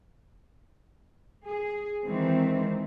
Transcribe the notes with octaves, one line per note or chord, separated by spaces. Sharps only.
G#4
D#3 E3 G#3 C4